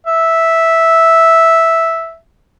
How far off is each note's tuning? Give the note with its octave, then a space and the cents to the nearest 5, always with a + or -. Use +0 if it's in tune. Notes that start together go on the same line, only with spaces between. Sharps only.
E5 -5